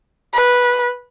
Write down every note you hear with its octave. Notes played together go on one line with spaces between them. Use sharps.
B4